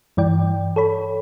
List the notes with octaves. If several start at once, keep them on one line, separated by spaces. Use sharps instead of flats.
G2 E3 D5 G5
A4 C#5 B5